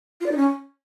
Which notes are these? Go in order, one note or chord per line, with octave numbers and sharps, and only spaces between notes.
F4
D5
D#4
C#4